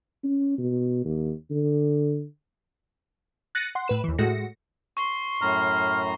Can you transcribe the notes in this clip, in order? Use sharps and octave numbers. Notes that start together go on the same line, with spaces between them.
C#4
B2
D#2
D3
F#6 A6 A#6 C#7 D#7
F#5 C6
A2 B4 E7
D#2 E3
A2 G#3 A3 F#4 A#6 C#7
C6 C#6
F#2 A2 A#5 F6